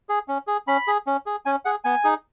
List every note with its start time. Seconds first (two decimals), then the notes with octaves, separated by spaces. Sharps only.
0.09 G#4
0.28 C#4
0.47 G#4
0.67 C#4 B5
0.88 G#4
1.07 C#4
1.26 G#4
1.45 C#4 G#5
1.65 G#4 F#5
1.84 B3 G#5
2.04 D#4 G#4